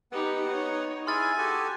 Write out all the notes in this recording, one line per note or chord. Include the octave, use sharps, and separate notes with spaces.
B3 D#4 G4 F#5
D#4 C#5
E4 G#4 G#5 C6 F6 A6
F#4 G4 A4